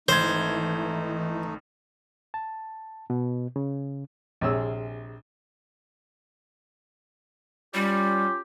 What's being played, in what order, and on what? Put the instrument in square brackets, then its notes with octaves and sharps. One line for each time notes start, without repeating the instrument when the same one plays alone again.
[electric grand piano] G#1 G#6 [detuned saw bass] E3 [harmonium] A3 D#4 [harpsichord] C5
[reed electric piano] A5
B2
C#3
[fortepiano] A#1 C3 G#3 G#4 C#5 E6
[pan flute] G3 [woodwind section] C#4 F4 G4